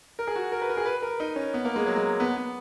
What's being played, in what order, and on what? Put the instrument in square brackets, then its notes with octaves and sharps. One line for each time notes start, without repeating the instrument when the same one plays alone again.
[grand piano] A#4
G#4
F#4
A#4
B4
A#4
G#4
B4
A#4
D#4
C#4
B3
A#3
G#3
F#3
G#3
B3
B3